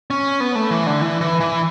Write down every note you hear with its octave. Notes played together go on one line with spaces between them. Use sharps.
C#4
B3
A3
E3
D3
E3
E3
E3